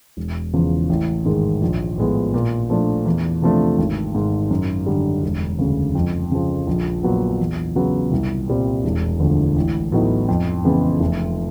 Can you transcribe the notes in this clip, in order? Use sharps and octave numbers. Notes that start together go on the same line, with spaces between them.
E1
E2 C#3 F3
A1
G#2 D#3 G#3
A#1
A2 F3 G#3 B3
A#2
F3 A3 D4
E2
C3 F3 A3 D4
G#1
G#2 D#3
F#2
D3 G3
E1
D2 C#3
F2
C#3 F3
A#1
A#2 F#3 B3
E2
C#3 F#3 B3
C2
A#2 G3 C4
E1
D2 D3 F3
A1
A2 F#3 B3 D#4
F2
C#3 E3 G#3 B3
F1